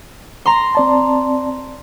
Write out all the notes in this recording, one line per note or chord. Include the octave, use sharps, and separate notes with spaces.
A#5 C6
C4 D5 A5